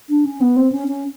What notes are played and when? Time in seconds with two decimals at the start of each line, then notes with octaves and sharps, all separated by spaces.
0.10 D4
0.25 C#4
0.41 B3
0.57 C4
0.72 C#4
0.88 C#4